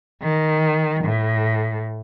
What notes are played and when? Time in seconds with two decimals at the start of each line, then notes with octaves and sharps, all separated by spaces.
0.22 D#3
1.03 A2